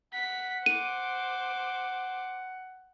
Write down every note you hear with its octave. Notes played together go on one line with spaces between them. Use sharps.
F#5 B6
C5 D6 D#7